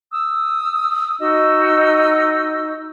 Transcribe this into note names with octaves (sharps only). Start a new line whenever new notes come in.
D#6 E6
D#4 F#4 D#5 E6